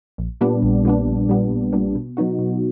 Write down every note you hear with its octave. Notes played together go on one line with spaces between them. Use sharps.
A#1
A#2 G3 B3 D4
A#1
A#2 G3 B3 D4
A#1
A#2 G3 B3 D4
A#1
A#2 G3 B3 D4
B2
F#3 B3 D#4 F#4
B2